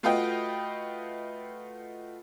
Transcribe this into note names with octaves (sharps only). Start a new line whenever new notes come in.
A3 F4 F#4 B4 D#5 G5